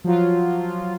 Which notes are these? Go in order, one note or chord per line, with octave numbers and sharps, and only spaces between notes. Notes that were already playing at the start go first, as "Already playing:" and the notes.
F3 F#3 F4